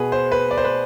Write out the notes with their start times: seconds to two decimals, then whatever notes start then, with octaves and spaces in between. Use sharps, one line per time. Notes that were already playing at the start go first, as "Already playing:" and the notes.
Already playing: B2 G#4 B4
0.12 C5
0.32 B4
0.51 D5
0.57 C5
0.64 B4